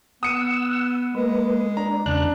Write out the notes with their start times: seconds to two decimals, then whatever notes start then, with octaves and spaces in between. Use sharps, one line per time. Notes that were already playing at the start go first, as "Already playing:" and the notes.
0.23 B3 F#5 D#6 E6 C#7 D#7
1.15 G#3 A#3 B4
1.77 D4 A#5
2.06 E2 C#3 D4 F#6